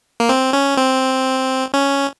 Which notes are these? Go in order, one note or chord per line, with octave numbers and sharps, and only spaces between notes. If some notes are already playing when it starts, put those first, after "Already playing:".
A#3
C4
C#4
C4
C#4